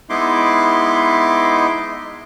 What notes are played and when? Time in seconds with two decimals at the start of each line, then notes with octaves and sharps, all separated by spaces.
0.10 G#3 B3 D#4 E4 C6 D6